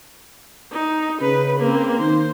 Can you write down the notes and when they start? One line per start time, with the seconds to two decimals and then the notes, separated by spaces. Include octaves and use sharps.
0.72 D#4
1.21 C#3 B4
1.60 A#3 C4
1.99 D#3 C5